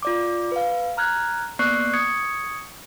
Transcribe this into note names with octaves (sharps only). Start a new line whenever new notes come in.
F4 D5 D6
B4 F5
A#5 F6 F#6 G#6
A#3 B3 D5 C#6 F#6 C7
C#6 D#6 G#6 C#7